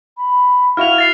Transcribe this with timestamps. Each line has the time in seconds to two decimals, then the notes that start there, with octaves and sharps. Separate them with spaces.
0.17 B5
0.77 E4 F#4 E5 F5 F6 F7
0.98 A6 C7